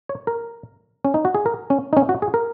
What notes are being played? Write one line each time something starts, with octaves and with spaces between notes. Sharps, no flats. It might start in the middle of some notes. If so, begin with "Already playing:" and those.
C#5
A#4
C#4
D#4
F#4
G#4
A#4
C#4
D#4
C#4
F#4
G#4
A#4